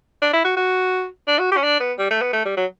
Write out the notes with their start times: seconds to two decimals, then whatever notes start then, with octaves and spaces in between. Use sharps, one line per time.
0.22 D4
0.33 E4
0.45 F#4
0.57 F#4
1.28 D4
1.39 F#4
1.52 G4
1.57 C#4
1.63 D4
1.80 B3
1.99 G3
2.11 A3
2.22 B3
2.33 A3
2.45 G3
2.57 F#3